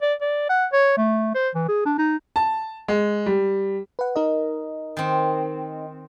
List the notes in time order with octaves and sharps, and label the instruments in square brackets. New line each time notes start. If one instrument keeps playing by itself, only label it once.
[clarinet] D5
D5
F#5
C#5
A3
C5
E3
G#4
D4
D#4
[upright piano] A5
G#3
G3
[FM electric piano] B4 F#5
D#4 A#4 D#5
[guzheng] D#3 C4